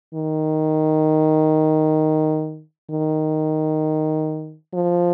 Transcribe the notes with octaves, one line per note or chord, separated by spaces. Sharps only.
D#3
D#3
F3